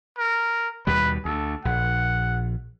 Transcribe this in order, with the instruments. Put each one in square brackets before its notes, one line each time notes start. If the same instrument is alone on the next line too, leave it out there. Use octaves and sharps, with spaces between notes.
[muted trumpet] A#4
[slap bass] D#2 B2 G3 [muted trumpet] B4
[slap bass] D2 [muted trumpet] A4
[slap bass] A#1 [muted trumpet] F#5